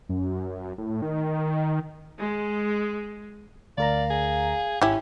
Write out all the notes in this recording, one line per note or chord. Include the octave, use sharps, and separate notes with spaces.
F#2
A2
D#3
G#3
D2 A#4 D5 F5 A#5
G#4
G#1 C#4 E4 G4 G#5